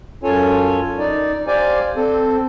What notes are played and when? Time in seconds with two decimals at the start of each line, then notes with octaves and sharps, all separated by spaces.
0.23 F#2 C#4 F4 A4 C#5 G#5
0.98 D#4 D5
1.47 G4 C5 D5 F5 G#5
1.96 C4 A4